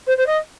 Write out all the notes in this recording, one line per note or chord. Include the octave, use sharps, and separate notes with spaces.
C5
C5
D#5